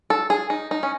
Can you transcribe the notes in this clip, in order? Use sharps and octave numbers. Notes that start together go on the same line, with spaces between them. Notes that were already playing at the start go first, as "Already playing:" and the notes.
A4
G#4
D#4
D#4
C#4